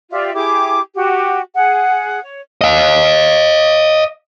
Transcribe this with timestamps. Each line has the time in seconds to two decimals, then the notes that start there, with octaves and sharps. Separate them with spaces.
0.11 F4 G4 D5 E5
0.35 E4 G4 G#4 D6
0.95 F#4 G4
1.55 G#4 F#5
2.22 C#5
2.61 D#5 F5